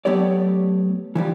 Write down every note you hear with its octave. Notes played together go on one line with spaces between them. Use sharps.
F#3 A3 B3 G4 C#5 D5
E3 F3 G3 F4